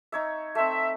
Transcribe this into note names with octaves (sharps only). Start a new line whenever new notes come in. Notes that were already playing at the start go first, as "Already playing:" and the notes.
D#4 C#5 E5
A3 C4 E5